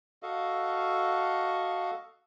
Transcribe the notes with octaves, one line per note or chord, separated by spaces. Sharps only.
F#4 A4 D#5 F5